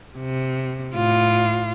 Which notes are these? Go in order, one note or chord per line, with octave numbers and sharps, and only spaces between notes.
C3
A2 F4